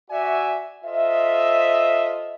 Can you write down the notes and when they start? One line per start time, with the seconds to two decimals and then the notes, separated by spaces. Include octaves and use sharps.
0.11 F#4 D5 E5 G#5
0.85 F4 A4 C5 D#5 E5